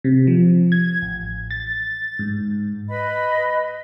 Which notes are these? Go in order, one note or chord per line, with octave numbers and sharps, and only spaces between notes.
C3
F3
G#6
A1
A6
G#2
B4 D#5 B5